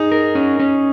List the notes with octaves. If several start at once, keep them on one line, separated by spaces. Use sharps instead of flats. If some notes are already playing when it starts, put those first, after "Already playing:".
Already playing: D#4 G#4
A#4
C#4
C#4